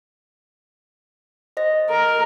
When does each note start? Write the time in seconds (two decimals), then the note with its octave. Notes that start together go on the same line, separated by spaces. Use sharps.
1.57 C5 D#5 A#6
1.90 A#4